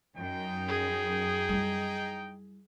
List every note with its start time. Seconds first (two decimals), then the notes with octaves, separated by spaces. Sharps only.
0.16 F#2 D#4 G5
0.68 G#4
1.49 G3 E4